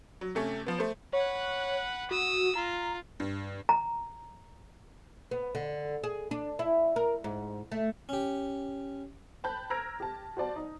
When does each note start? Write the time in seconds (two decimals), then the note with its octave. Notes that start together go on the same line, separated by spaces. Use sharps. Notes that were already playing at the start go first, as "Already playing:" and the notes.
0.21 F#3
0.35 C3 A3 C#4
0.66 F3 B3
0.78 A3 C5
1.13 B4 C#5 F#5
2.11 F#4 D#6 E6
2.55 F4 A#5
3.20 G2
3.69 A#5
5.31 B3
5.55 D3
6.04 G#4
6.31 D4
6.59 E4
6.96 A#4
7.24 G#2
7.72 A3
8.09 C#4 G4
9.44 G5 A5 B5 F#6 G6
9.70 A#5 E6 F6 G#6 A#6 D7
10.00 G4 A5
10.37 F#4 C5 D5 A5
10.56 D#4